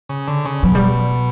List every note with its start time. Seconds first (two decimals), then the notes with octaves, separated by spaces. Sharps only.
0.09 C#3
0.28 D3
0.45 C#3
0.63 B2 F#3
0.75 G3